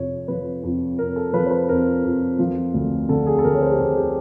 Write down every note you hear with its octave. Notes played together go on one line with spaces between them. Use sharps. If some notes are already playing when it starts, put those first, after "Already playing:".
Already playing: F2 C3 C#5
F3 B4
F2
C3 A#4
A4
F3 B4
C5
B4
F2 A#4
F2
F3
D2
D3 A4
G#4
A4
D2 A#4
C#5
C5
G4
D3 G#4
G4